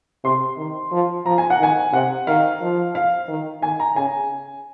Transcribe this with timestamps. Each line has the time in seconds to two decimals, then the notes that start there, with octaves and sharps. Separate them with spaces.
0.24 C3 C6
0.58 D#3
0.92 F3
1.26 F3 A#5
1.38 G#5
1.50 F#5
1.60 D#3 G#5
1.93 C3 F#5
2.27 D#3 F5
2.61 F3
2.95 F5
3.29 D#3
3.62 D#3 G#5
3.80 A#5
3.96 C#3 G#5